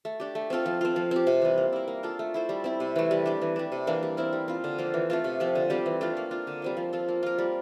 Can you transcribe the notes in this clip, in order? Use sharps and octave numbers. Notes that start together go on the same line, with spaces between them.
A3
D4 G4
A3
C4 F4 A4
F3
C4 F4
F3
C4 G4
C3
E3 G3
A#3
E4 A#4
A#3
D4 F4 A4
A3
E4 A4 C5
G3
C4 E4
C3
E3 A3
G3
D4 G4
E3
G3 D4
C3
E3 A#3 D4
G3
C4 E4 A#4
G3
C4 F4
D3
F3 A#3 F4
E3
A3 C4 F4
C3
F3 C4 G4
D3
G3 C4 G4
E3
A3 D4 F4
A#3
D4 F4
D3
G3 C4 F4
F3
C4 F4 A4
A#3
F4 A#4
G3